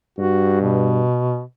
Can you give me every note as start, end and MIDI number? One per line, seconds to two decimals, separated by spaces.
0.18 1.02 43
0.18 0.58 66
0.61 1.41 47